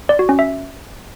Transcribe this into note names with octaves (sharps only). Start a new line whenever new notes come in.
D5
F#4
C#4
E5